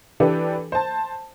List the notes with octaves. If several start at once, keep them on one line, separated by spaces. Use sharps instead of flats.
E3 D4 G4 A4 B4
C5 A5